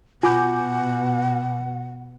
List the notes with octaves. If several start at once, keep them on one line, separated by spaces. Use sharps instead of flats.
B2 F4 F#5 G#5 B5 D6 G6